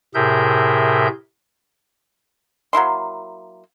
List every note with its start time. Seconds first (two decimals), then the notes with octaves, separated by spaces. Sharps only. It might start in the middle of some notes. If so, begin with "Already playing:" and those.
0.15 A2 C3 G#4 A#4 E5 G6
2.73 F#3 A#3 E4 C6